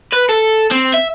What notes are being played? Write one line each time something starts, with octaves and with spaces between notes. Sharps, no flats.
B4
A4
C4
E5